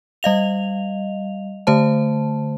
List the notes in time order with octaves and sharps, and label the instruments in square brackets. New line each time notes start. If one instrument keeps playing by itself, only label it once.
[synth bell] G3 D#5 F5 F7
D3 A3 C5 A5